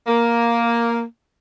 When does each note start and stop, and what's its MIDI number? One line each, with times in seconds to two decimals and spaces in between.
0.07 1.02 58